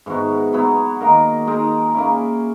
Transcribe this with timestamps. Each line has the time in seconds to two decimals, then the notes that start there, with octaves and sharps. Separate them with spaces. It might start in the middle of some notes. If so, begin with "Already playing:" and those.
0.06 G#2 E3 B3 F#4
0.53 F#3 B3 E4
1.00 D#3 A#3 D#4 A#4
1.47 G#3 D#4 A#4
1.94 A#3 C#4 E4